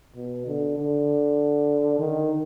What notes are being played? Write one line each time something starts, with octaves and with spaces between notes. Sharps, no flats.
B2
D3
D3
D#3